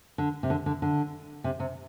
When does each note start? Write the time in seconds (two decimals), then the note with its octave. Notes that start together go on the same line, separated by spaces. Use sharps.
0.18 D3
0.43 C3
0.50 D3
0.66 D3
0.82 D3
1.44 C3
1.60 C3